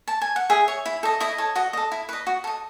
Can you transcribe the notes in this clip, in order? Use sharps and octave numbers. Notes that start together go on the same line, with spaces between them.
A5
G#5
F#5
G#4 E5
C#5
E4
A4 D#5
E4 D#5
A4 C#5
F#4 D#5
A4 D#5
E4
B4 D#5
F#4
A4 D#5